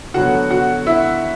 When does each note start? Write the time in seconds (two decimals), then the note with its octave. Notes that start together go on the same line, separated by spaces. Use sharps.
0.14 D3 F#3 B3 F#4 F#5
0.50 F#4 F#5
0.87 E4 E5